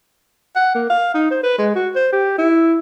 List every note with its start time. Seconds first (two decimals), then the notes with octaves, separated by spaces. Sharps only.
0.56 F#5
0.75 A#3
0.90 F5
1.14 D#4
1.31 C5
1.43 B4
1.58 G#3
1.75 F#4
1.95 C5
2.12 G4
2.38 E4